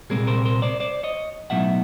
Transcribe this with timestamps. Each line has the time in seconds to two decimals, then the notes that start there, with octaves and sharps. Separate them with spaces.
0.10 C2 A#2 G3 C4 G#4 A#4
0.27 A#4 C5
0.45 A#4 C5
0.62 C5 D5
0.80 C5 D5
1.03 C#5 D#5
1.50 B1 A2 F#3 B3 D#4 E5 F#5